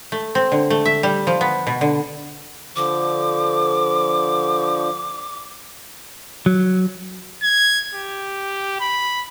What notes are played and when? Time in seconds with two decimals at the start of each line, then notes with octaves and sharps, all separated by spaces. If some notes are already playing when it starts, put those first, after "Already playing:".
0.12 A3
0.35 C4
0.52 D3
0.70 A3
0.85 E5
1.03 G3
1.27 F3
1.41 B3
1.67 B2
1.81 D3
2.76 D3 F3 D6
6.46 F#3
7.43 G#6
7.95 G4
8.80 B5